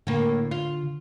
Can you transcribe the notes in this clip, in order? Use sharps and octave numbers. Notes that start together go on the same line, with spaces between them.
A2 D3 A#3
F4